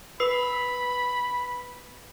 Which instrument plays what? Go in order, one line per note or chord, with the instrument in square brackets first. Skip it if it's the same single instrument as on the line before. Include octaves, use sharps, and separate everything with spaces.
[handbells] B4 E6 C7 [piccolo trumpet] B5